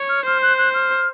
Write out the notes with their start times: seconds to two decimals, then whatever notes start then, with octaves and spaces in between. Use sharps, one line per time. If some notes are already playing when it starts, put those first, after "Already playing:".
Already playing: C#5
0.09 F6
0.25 C5 F6
0.42 F#6
0.58 F#6
0.74 F6